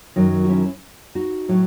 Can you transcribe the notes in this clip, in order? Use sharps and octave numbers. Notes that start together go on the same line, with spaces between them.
F#2 D#3 F#3
F#4
C#4 E4
D#4 F#4
A2 F#3